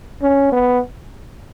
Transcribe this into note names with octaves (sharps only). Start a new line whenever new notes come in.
C#4
B3